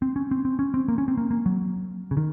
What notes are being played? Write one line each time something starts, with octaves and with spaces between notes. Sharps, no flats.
C4
C#4
C4
C4
C#4
C4
A#3
C#4
C4
A#3
A#3
F#3
C#3
D#3